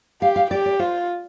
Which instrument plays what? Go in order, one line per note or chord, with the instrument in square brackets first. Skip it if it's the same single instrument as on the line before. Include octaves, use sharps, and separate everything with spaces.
[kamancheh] G4 [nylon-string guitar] F5
[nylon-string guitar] F5
[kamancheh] G4 [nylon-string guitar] D5
[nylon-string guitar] D5
[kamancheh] F4 [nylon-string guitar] C5